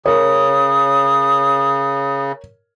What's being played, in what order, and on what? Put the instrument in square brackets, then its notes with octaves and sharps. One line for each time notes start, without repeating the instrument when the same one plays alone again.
[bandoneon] C#3 [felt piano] A#4 C#5 [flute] D#6